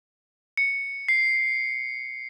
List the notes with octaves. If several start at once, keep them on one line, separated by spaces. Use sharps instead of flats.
C#7
C7